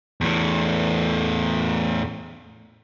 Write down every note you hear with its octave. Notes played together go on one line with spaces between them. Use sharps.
E2 A2